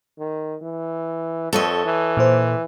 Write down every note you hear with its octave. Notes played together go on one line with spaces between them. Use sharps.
D#3
E3
F2 A4 C#5 D#5
E3
A#2 A#3 C5